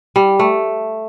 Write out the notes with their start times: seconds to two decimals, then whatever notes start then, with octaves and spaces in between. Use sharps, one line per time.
0.16 G3
0.39 A3